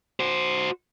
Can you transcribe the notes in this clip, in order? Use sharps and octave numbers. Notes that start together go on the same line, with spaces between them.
F#4 C5